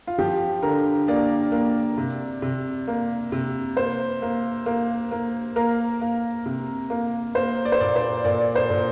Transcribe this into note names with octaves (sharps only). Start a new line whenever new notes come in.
F4
F3 G4
D3 A#4
A#3 D5
A#3
C3
C3
A#3
C3
A#3 C5
A#3
A#3
A#3
A#3 A#4
A#3
C3
A#3
A#3 C5
D5
C5
A#2 D5
C5
A#2 D5
C5
A#2